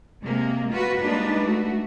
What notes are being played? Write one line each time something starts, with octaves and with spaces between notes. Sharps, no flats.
C3 G#3 A#3
F4 F#4 B4
G3 G#3 A#3 D4 D#4 B4
A3 F#4